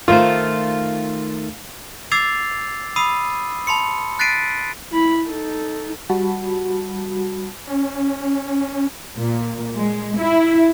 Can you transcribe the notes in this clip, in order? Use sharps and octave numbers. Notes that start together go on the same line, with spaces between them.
D#3 A3 F4 C5
D6 E6 G#6 A6 C7 F7
B5 D#6 E6 C7 D#7
A5 B5 C6 C#7
F#6 A6 B6 C7 D7 D#7
E4 B5
D#4 A4
G3 F#4 A5 B5
C#4
A#2
G#3
E4